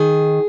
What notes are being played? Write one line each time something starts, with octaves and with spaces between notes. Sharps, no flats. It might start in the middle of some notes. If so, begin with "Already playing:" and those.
Already playing: D#3 G#4